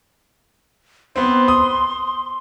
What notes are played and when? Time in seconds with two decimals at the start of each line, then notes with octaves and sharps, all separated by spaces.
1.16 B3 C4 C6
1.48 D#6